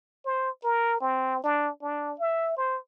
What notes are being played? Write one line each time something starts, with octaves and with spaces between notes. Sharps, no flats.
C5
A#4
C4
D4
D4
E5
C5